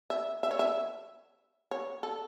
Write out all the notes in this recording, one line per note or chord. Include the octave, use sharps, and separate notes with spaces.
E5
E5
C#5
E5
C#5
A4